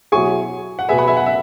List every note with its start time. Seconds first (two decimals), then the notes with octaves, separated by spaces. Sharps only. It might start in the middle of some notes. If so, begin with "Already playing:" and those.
0.12 B2 F#3 E4 G#4 G#5 C#6
0.79 F#5
0.89 B2 B3 G#4 B4 E5 G#5
0.98 F#5 B5
1.07 E5 G#5
1.17 F#5
1.26 E5